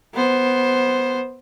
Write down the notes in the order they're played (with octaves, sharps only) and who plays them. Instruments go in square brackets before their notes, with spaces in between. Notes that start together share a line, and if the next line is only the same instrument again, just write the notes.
[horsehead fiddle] B3 C5